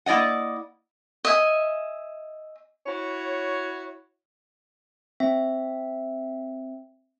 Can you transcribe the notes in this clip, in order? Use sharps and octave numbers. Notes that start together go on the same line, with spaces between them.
A#3 E4 D5 D#5 F#5
D#5 E5 G#5
E4 F#4 C#5
C4 E5